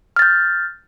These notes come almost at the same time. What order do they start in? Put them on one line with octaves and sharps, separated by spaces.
F6 A6 G6